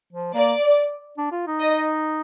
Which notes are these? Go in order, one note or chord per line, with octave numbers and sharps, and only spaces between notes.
F3
A#3 D5
D4
F4
D#4
D#5